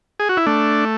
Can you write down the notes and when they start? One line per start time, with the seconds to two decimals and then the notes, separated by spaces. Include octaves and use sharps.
0.20 G#4
0.29 F#4
0.37 E4
0.46 A3 D4